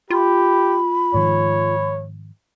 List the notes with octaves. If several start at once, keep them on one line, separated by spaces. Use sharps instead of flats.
F4 G4 B5
G#2 D#3 F3 C#5